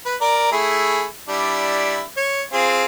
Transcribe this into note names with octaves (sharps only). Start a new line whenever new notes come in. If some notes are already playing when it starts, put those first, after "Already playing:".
B4
A#4 D5
A3 E4 G#4
G3 D4 E4
C#5
C4 F4 G#4